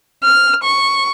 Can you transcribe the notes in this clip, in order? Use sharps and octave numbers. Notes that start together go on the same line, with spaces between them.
F6
C#6